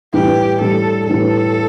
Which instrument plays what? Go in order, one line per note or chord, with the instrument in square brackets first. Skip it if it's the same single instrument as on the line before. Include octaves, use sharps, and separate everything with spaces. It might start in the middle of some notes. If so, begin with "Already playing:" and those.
[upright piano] A2 E3 G3 [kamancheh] G4
[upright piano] A2 E3 G3 [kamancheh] A4
[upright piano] A2 E3 G3 [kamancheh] A4